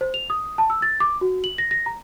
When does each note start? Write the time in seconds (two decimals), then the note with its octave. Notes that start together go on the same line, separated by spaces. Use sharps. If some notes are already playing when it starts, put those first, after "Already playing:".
0.01 C5
0.14 F7
0.30 D#6
0.58 A5
0.70 E6
0.82 A6
1.00 D6
1.21 F#4
1.44 F#7
1.58 A#6
1.71 A#6
1.86 A#5